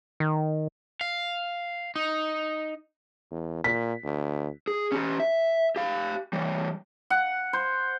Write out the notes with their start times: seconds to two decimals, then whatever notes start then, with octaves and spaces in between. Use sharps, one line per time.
0.20 D#3
1.01 F5
1.96 D#4
3.31 E2
3.64 A#2 B6
4.04 D2
4.68 G#4
4.92 C#4 G4
5.20 E5
5.76 G4 F5
6.33 E3 G3
7.10 F#5
7.53 C5